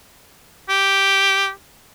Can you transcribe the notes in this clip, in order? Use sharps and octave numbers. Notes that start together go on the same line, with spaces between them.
G4